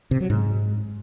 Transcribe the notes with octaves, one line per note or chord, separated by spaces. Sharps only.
C3
F#3
G#2